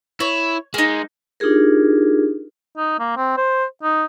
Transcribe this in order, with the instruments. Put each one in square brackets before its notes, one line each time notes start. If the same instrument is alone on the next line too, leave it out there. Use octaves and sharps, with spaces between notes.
[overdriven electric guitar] E4 [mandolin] C#5
[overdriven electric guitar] G#3 [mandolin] A#3 D#4
[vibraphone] D4 D#4 F4 G4 G#4 A#4
[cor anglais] D#4
A#3
C4
C5
D#4